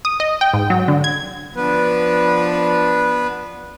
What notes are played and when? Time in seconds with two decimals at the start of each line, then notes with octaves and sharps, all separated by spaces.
0.05 D#6
0.20 D#5
0.41 G5
0.54 G#2
0.70 F#3
0.88 D3
1.04 G#6
1.56 F3 B3 D4 B4